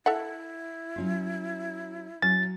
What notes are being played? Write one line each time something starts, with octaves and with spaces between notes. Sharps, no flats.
E4 A4 E5 F#5
F#3 C#4 F4
F#3 C#4 A6